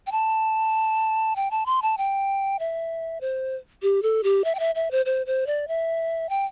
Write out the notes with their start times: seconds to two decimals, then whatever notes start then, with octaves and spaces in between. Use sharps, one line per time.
0.07 G5
0.12 A5
1.36 G5
1.51 A5
1.66 C6
1.82 A5
1.98 G5
2.59 E5
3.21 C5
3.82 G4
4.03 A4
4.23 G4
4.44 E5
4.55 G5
4.59 E5
4.75 E5
4.91 C5
5.06 C5
5.26 C5
5.47 D5
5.68 E5
6.29 G5